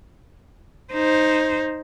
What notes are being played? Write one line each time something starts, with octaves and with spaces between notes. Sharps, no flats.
D#4 C5